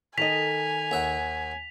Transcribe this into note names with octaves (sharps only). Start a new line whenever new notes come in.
D#3 A4 D#5 G#5 B6 F7
D#2 E5 F#5